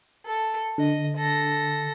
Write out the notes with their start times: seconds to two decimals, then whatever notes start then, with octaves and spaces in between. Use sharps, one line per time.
0.25 A4
0.78 D3 D#5
1.15 A4 A#6